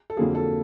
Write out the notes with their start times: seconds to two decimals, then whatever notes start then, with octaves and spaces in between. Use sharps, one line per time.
0.10 A4
0.17 F2 D3 F#3 A#3 G#4
0.35 A4